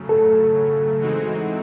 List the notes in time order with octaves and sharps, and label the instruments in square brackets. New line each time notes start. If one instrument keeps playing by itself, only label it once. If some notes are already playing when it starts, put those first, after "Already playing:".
Already playing: [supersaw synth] C#3 F#3 A3
[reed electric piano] A4
[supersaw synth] E3 G#3 C4 D#4 F#4